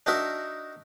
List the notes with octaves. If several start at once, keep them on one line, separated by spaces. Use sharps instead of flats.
D4 D#4 F#4 A#4 E5